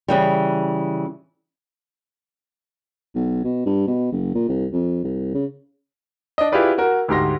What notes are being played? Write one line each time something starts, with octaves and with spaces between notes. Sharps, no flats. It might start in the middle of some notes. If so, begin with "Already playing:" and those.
C#3 E3 G3
B1
B2
G2
B2
F#1
A#2
C2
F2
C2
C#3
D4 D#5
E4 F4 G4 G#4 B4 D5
F#4 A#4
D2 G#2 G4 C6 A#6